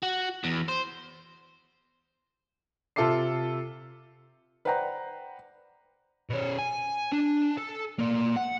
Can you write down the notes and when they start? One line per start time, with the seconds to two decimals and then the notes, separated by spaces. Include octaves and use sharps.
0.03 F#4
0.44 E2
0.68 C5
2.96 C3 F4 A4 E5 D6 C7
4.65 B4 C5 D5 F#5 G5 A#5
6.30 B2 C#4
6.58 G#5
7.12 D4
7.57 A4
7.99 A#3 D5
8.36 F#5